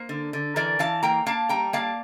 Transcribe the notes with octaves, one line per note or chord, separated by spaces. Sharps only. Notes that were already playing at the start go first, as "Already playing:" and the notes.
Already playing: A#3 C5
D3
D3
E3 A#4 D5
E3 F5 A5
A#3 G5 A#5
A#3 F5 A5
G3 G5 A#5
A#3 F5 A5